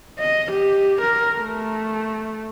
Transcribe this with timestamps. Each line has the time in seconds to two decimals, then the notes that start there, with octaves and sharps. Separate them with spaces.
0.19 D#5
0.52 G4
1.02 A#4
1.36 A3